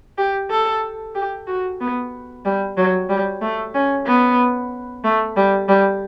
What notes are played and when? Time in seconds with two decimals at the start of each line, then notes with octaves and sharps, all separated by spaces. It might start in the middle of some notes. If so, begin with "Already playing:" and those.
0.18 G4
0.51 A4
1.15 G4
1.47 F#4
1.81 B3
2.45 G3
2.77 F#3
3.09 G3
3.41 A3
3.74 C#4
4.06 B3
5.04 A3
5.36 G3
5.68 G3